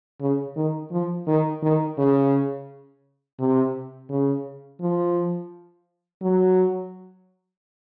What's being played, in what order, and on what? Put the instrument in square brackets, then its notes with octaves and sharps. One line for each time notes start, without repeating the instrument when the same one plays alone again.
[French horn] C#3
D#3
F3
D#3
D#3
C#3
C3
C#3
F3
F#3